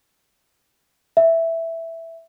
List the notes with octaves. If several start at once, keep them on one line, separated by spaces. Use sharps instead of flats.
E5